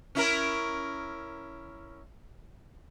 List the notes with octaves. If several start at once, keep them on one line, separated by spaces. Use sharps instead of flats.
C#4 E4 A#4